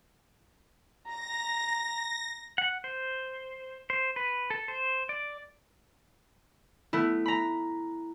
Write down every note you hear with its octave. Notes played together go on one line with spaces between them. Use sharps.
A#5 A#6
F#5
C5
C5
B4
A4
C5
D5
A3 B3 E4
A#5 B5